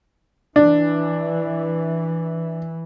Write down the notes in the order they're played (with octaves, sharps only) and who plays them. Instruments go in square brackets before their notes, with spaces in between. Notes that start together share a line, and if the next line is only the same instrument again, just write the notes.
[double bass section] E3 [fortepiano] D4